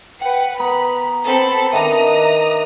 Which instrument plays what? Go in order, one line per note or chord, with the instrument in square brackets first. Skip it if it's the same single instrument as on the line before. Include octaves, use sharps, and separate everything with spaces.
[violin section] B4 F#5 [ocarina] G5
[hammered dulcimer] B3 [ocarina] A#5 [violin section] B5
[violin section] C4 A4 B5
[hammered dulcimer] D#3 D4 [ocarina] E5 [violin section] A#5 D#6